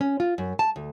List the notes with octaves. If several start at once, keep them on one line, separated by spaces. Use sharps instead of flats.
C#4
F4
F#2
A5
D2